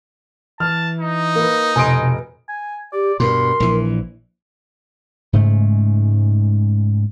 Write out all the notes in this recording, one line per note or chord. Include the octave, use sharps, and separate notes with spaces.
E3 A5 F6
D#4
A#3 B4
F1 B2 G#5 C6 D#6 D7
G#5
G4 D5
G2 B2 A#4 C6
A#1 E3
G#2 C#3 G#3 A3